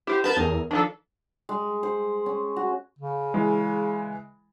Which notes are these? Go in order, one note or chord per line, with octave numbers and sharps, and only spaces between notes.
E4 G4 C5
A#4 B4 A5 G6 G#6
E2 G#4 A#4
D#3 F3 D4 A4
G#3
C5
C#4
F#4
C#3
E3 G#3